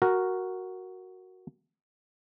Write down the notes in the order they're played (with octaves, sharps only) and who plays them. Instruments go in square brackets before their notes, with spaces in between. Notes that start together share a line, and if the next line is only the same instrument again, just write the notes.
[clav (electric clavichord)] F#4 A#4